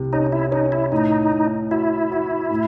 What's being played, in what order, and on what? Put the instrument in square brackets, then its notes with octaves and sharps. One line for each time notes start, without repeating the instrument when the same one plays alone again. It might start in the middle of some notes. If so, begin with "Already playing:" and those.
Already playing: [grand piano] C2 C3
[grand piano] C#4 [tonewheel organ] D#4
[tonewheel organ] E4
[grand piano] C#4 [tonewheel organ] D#4
[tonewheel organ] E4
[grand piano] A2 [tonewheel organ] D#4
[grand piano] A2
[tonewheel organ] E4 [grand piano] F#4
[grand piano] F#4
A2